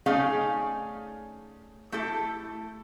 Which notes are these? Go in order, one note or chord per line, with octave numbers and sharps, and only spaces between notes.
A3 C#4 D#4 G#4 D5 F5
A3 E4 G4 A4